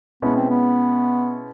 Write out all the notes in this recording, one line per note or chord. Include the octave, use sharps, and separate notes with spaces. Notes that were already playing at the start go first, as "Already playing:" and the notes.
B2 G#3 B3 C#4 E4
C4
B3